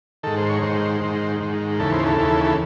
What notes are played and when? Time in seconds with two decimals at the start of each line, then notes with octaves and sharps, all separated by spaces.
0.23 G#2 D#3 A4
0.37 C5
0.49 C#5
0.62 G#2 D#3 C5
1.01 G#2 D#3
1.40 G#2 D#3
1.79 D#2 C#3 E3 A4
1.92 C5
2.06 A4
2.19 D#2 C#3 E3
2.45 A4